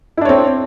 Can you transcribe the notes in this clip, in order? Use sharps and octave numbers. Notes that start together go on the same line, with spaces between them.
C4 D4 E4 C#5